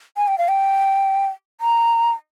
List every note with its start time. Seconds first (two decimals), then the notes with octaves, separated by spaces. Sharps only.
0.17 G#5
0.28 G5
0.38 F5
0.48 G5
1.61 A#5